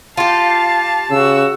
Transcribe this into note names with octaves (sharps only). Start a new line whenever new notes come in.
F4 G4 F5 A5
C#3 F#4 E6